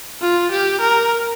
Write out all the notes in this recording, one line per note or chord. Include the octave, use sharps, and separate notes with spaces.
F4
G4
A#4